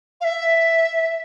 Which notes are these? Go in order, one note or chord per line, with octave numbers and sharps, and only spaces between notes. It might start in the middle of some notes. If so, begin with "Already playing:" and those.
F5
E5